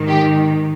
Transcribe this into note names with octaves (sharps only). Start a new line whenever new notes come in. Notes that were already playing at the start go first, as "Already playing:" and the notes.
Already playing: G#2 D#3
G4